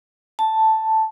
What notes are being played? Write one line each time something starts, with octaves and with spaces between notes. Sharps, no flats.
A5